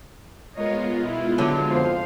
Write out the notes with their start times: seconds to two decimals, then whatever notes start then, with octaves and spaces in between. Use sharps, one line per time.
0.55 G#3 B3 F4 A#4 C#5 D#5
1.01 B2 E4
1.38 D3 F#3
1.71 F2 F3 C5 F5